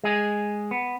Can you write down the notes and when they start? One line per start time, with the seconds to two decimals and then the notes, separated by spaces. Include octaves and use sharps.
0.04 G#3 G#4
0.71 B3